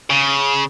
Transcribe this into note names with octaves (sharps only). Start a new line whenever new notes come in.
C#3